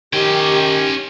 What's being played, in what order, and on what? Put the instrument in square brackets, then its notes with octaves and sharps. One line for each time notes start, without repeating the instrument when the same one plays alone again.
[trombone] D#3 [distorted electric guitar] C#4 G5 [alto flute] G4